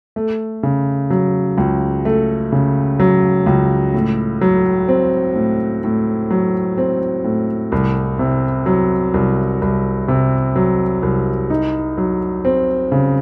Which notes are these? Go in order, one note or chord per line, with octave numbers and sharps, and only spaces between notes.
A3
C#3
F#3
C#2
A3
C#3
F#3
C#2
A2
F#3
C4
A2
A2
F#3
C4
A2
C2
C3
F#3
C2
C2
C3
F#3
C2
D#4
F#3
C4
C#3